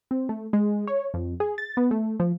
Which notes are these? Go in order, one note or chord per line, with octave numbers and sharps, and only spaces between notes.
C4
A3
G#3
C#5
F2
G#4
A6
B3
A3
F3